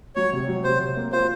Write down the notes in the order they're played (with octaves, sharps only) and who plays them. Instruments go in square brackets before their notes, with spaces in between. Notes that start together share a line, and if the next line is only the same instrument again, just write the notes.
[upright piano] F#3 [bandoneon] C#5
[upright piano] C3
F#3
[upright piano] C3 [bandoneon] C5
[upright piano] C3
A#3
[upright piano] F4 [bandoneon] C5